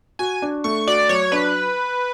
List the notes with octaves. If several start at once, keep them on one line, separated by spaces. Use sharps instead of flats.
F#4 G#5
D4
A3 C#6
F#4 D5
F#3 C#5
D4 B4